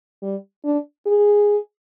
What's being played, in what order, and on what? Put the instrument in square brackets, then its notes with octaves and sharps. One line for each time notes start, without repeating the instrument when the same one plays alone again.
[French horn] G3
D4
G#4